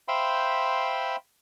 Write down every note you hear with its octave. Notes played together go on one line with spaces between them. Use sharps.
C5 E5 F5 G5 B5 C6